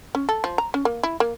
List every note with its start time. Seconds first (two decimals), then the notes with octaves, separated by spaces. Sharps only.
0.15 C#4
0.29 A4
0.44 F3
0.58 A#5
0.74 C#4
0.85 A#3
1.03 E4
1.20 A#3